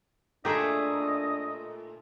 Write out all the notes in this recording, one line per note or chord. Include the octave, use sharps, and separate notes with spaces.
A#2 A3 D4 G4 G#4 D#5 E5